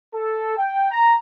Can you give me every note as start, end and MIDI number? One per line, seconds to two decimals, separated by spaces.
0.14 0.54 69
0.57 0.89 79
0.90 1.14 82